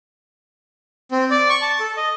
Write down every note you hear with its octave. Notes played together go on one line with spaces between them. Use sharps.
C4
D5
C#6
A5
A4
D#5